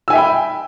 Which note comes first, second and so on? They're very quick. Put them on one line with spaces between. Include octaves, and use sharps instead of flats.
E6 G#5 E5 G5 B5